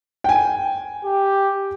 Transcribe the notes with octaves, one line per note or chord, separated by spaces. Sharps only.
G5 G#5
G4